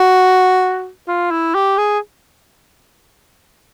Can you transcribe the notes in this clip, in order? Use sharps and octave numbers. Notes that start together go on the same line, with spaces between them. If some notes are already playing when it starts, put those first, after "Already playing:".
Already playing: F#4
F4
E4
G4
G#4